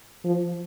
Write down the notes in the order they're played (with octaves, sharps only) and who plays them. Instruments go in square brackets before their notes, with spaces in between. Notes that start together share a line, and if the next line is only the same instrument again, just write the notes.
[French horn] F3